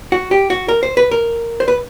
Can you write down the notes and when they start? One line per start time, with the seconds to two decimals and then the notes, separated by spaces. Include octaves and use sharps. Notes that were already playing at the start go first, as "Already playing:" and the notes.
0.12 F#4
0.31 G4
0.50 F#4
0.68 A#4
0.83 C5
0.97 B4
1.11 A#4
1.60 C5
1.68 B4